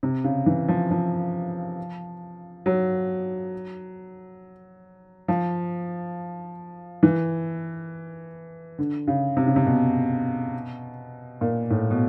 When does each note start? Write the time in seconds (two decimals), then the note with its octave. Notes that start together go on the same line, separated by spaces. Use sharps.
0.03 C3
0.24 C#3
0.46 E3
0.68 F3
0.91 F3
2.66 F#3
5.28 F3
7.03 E3
8.79 D3
9.08 C#3
9.37 C3
9.47 C#3
9.56 C3
9.66 B2
11.41 A#2
11.70 A2
11.91 B2